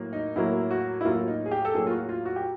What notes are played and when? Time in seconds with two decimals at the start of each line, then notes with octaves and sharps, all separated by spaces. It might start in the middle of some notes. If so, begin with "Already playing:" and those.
Already playing: A2 F#3 A#3
0.13 D#4
0.36 A2 F#3 A#3 E4
0.71 F#4
1.01 E4
1.05 A2 F#3 A#3 F4
1.28 D#4
1.46 G#4
1.51 G4
1.65 A4
1.74 A2 F#3 A#3 G#4
1.87 F4
1.91 F#4
2.09 F4
2.25 F#4
2.36 G4